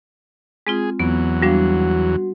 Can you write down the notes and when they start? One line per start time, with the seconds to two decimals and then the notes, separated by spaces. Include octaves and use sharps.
0.67 G#3 C4 F4 G#4
0.99 E2 F#3 B3
1.42 G3 D4 F#4 F5